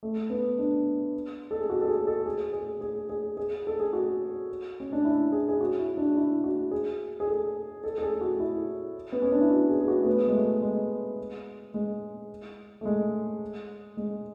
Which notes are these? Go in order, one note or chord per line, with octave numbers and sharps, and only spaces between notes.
A3
B3
D4
A4
G#4
F#4
A4
G#4
A4
G#4
G#4
G#4
G#4
G#4
A4
G#4
F#4
C#4
D4
E4
G#4
G#4
F#4
E4
D4
E4
F#4
G#4
G#4
A4
A4
A4
G#4
F#4
E4
B3
C#4
D4
E4
F#4
G#4
G#4
F#4
A3
B3
G#3
A3
G#3
G#3
A3
G#3
G#3